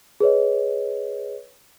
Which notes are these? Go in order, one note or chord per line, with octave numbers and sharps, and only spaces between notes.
G#4 B4 C#5 D#5